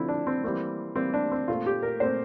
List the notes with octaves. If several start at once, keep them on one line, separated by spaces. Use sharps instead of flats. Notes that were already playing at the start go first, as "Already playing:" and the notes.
Already playing: D3 F3 C4 E4
D4
C4
E3 G3 A#3 C4
E3 G3 A#3 C4
D4
C4
A#2 A3 C4 F4
G4
A#4
A#2 A3 C4 C5